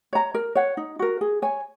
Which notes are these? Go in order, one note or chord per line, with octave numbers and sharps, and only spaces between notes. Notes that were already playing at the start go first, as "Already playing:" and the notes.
C#5 A#5
A#4
C#5 F#5
D#4
F#4 A#4
G#4
C#5 G#5